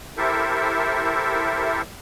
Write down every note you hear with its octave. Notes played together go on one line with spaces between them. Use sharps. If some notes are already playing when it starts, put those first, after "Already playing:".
E4 G4 A4 A#4 C5 E5